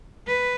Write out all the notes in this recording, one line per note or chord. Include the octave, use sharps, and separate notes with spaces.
B4